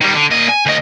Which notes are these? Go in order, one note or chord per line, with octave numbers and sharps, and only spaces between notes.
D#3 G3
D3
A#2 D#5
G#5
D2 D#5